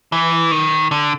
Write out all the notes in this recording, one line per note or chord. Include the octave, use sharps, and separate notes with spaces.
E3
D#3
D3